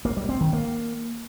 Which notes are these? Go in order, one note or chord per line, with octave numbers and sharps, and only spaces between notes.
A#3
G3
C4
D#3
A#3